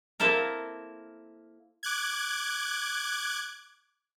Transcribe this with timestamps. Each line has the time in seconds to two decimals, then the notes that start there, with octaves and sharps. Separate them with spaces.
0.20 A#3 C4 E4 A4 A#4
1.83 D6 F#6 G#6